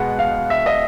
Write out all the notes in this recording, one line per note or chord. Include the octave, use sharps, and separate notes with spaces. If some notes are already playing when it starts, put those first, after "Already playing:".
Already playing: B2 G#3 B3 F#5
F5
E5
D#5